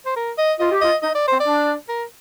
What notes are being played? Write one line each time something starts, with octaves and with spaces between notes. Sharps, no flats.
C5
A#4
D#5
F4 D#5
G4
F4 D#5
D#4 D#5
D5
C4 C5
D5
D4
A#4